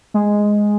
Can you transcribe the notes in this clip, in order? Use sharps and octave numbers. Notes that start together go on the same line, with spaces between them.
G#3